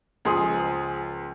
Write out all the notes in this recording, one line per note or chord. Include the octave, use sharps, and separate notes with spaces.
C#2 F3 G#4 C6 D#6